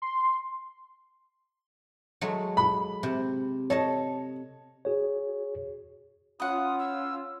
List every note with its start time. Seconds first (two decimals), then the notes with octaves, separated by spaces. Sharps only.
0.02 C6
2.21 F#3 G#3 A3
2.57 B5
3.03 C3
3.70 A4 C#5 D#5 A5
4.85 F#4 G#4 C#5
6.40 C#4 F4 B4 F#5 D#6
6.79 E6